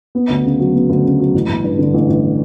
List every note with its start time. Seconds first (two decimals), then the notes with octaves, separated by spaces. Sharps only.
0.15 B3
0.30 D2
0.45 C#3
0.59 F#3
0.75 B3
0.90 D2
1.05 C#3
1.19 F#3
1.34 A1
1.49 A1
1.64 G2
1.79 D3
1.94 A1
2.08 A1